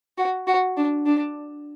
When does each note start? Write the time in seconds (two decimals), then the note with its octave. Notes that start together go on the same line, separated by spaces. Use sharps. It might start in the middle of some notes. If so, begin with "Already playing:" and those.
0.18 F#4
0.47 F#4
0.77 D4
1.06 D4